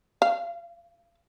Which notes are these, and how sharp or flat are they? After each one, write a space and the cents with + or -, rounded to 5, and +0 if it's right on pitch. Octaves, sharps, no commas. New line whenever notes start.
F5 -35